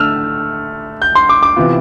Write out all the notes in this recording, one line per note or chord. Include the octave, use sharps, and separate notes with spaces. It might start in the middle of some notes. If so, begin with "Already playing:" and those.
Already playing: D3 A3 E6 F6
G6
C6
D6
D6
C3 E3 B3 F4